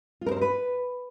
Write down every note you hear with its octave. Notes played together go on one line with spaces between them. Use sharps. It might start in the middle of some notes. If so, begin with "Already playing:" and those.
F4
A#4
C5
A#4
B4